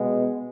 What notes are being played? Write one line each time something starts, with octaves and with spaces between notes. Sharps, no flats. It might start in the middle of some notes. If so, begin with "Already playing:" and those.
Already playing: B2 G#3 B3